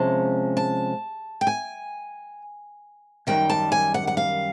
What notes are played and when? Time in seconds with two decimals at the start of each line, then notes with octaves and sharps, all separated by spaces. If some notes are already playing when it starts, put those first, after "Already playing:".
Already playing: C3 F3 G#3 C#4 A5
0.57 A5
1.41 G5
1.47 G#5
3.27 F#2 D#3 G3 G5
3.50 A5
3.72 G#5
3.94 F#5
4.07 F#5
4.17 F5